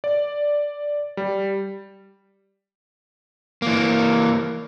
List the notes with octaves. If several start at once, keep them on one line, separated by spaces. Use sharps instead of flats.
D5
G3
E3 A#3